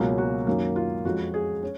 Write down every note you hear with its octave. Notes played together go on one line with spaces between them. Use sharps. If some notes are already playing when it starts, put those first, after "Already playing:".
Already playing: C#2 B2 F#3 A#3 C#4
F#4
F#2 D#3 F#3 A#3
F4
F2 F3 G#3 C#4 F#4
G#4
C#4